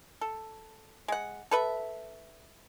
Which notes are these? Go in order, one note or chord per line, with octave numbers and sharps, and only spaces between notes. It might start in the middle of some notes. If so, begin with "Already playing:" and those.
A4
G#3 F#5
A4 B4 E5